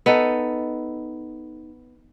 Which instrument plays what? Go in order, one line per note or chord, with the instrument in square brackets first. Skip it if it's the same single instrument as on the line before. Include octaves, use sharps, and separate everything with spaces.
[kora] B3 D#4 A4